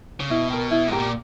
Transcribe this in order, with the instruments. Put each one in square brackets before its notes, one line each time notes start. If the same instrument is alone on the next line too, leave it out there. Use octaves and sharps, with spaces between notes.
[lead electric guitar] C#3
[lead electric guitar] B2 [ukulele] E4
[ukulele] G4 A#4
E4
[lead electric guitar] G#2 [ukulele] G4 A#4
[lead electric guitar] A#2